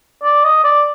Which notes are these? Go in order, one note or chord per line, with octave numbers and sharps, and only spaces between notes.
D5
D#5
D5